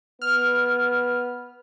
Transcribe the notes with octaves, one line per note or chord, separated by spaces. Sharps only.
B3 F6